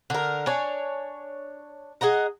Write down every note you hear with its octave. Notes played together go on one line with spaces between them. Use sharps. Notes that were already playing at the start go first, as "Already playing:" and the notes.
D3 A#4
D4 C#5 G#5
G#4 D#5 F#5 A#5